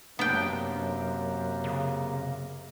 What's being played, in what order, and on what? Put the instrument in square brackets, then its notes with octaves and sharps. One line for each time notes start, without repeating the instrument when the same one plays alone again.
[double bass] F#2 [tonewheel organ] C3 A#3 [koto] B3 G5 [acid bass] D4
[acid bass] C#3